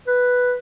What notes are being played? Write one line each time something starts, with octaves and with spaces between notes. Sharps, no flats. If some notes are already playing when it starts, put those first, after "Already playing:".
B4